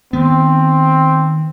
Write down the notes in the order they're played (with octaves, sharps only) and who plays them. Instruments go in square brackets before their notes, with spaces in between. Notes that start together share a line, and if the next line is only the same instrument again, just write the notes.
[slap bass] D#3 B3 [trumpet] C4